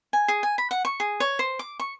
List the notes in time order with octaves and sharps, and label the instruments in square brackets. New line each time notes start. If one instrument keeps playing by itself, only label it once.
[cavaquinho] G#5
G#4
G#5
B5
F#5
C#6
G#4
C#5
C5
D6
C#6